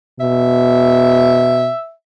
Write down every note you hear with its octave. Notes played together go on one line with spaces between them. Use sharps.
B2 E5